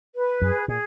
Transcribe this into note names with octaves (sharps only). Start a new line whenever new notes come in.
B4
F#2 G#4
A#2 G#4